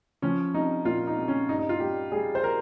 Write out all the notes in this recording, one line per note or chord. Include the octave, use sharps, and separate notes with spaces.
F3 C#4
C2 D#4
A#2 F4
D#4
C2
C#4
G2 D#4
D#4
F4
G3 G4
G3 G#4
C5
A#4